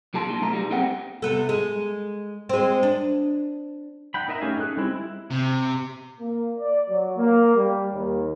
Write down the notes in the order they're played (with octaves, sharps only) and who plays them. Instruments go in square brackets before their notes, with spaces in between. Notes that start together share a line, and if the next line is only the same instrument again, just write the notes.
[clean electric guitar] B1 A#2 G#4 A5 C6
A#3 D#4
B1 A3 A#5
G3 D#4 G#4
A#3 C4 G#4 C5 F#5 G5
[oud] C3 B3 A4
G#3
G#3 C4
D4
[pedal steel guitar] D#4 F#5 G5 B5
D#4 A#4 D#5 E5
A3 C#4 G4 F5 G#5
C#4 D#4 G#4 A4 F#6
G3 G#3 C4 E4
E4
[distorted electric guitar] C3
[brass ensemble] A#3
D5
F#3
A#3
G3
D#2